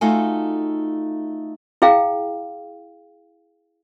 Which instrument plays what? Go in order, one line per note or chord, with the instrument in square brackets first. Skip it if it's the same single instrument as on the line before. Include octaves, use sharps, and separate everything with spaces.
[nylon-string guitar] A3 D#4 F4 F#4 A4 G#5
[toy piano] E4 G#4 F5 G5